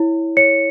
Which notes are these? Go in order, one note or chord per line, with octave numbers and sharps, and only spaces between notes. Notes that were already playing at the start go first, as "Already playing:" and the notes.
Already playing: E4 C#5
C#5 C#7